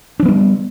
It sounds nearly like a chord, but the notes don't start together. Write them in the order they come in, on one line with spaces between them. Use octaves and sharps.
D4 F3 B3 G3